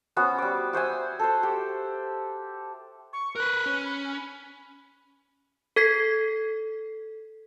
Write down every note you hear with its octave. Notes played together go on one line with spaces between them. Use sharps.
B3 C#4 F#4 C5
G3 D6
F#4 C5 E5 G#5
A4 C5
G4
C#6
A#4 B4 F#6
C#4
B5
A4 G#6 B6 C7